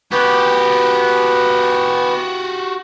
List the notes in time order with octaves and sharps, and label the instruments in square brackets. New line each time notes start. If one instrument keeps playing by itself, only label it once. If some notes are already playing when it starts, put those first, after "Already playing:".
[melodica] B3 [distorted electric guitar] F#4 G4